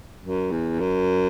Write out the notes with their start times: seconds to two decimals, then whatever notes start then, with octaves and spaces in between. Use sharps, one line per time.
0.22 F#2
0.51 E2
0.80 F#2